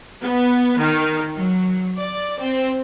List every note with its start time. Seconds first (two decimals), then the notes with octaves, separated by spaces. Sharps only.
0.22 B3
0.78 D#3
1.36 F#3
1.97 D5
2.39 C4